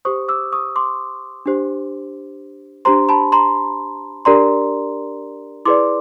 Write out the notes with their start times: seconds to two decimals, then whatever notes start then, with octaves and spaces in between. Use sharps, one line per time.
0.05 G4 C5 C#6 D#6
0.28 D6 E6
0.53 C#6 D#6
0.76 C6 D6
1.46 D4 G4 C5
2.85 D4 G4 C5 A#5 C6
3.09 A5 B5
3.32 A#5 C6
4.25 D4 G4 A#4 D5 A#5 C6
5.65 E4 G#4 B4 D5 C6 D6